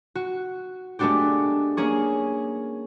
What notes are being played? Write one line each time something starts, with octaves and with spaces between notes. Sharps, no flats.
F#4
G#3 A3 B3 D4 F#4 G4
A#3 C#4 G#4 C#6